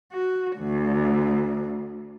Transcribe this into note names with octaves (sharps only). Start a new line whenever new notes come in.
F#4
D2